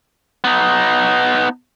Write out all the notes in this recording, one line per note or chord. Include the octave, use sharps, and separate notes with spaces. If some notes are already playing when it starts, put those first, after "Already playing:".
B3 D#4